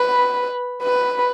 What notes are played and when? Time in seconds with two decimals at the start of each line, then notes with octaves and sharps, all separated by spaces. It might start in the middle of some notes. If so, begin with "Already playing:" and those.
Already playing: B4
0.82 B4